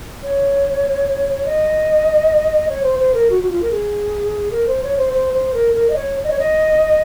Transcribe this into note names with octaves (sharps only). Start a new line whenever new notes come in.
C#5
D#5
C#5
C5
C5
A#4
F#4
F#4
F4
A#4
G#4
A#4
C5
C#5
C5
C5
C5
A#4
A#4
D#5
C#5
D#5
C#5
D#5